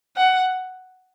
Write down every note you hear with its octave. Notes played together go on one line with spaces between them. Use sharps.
F#5